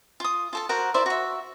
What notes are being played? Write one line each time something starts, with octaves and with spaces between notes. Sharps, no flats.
F4 D#6
F4 A4 A5
F#4 A#4 C5 F#5
E4 C5 D5 E5
F#4 E5